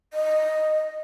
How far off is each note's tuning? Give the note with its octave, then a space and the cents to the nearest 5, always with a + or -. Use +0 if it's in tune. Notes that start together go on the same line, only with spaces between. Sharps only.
D#5 -5